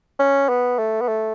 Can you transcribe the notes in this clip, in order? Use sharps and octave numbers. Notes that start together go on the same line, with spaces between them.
C#4
B3
A3
B3
A3